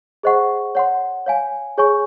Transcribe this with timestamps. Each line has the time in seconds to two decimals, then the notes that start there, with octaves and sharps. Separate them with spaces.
0.23 G#4 C5 D#5 F#5 C#6
0.75 C#5 F#5 C6
1.26 C#5 F5 G#5
1.78 G#4 C#5 G#5 C#6